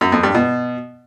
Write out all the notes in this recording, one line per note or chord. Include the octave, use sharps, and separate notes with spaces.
F#2
F2
G2
B2